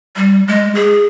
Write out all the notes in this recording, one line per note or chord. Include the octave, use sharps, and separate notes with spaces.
G3
G#3
G#4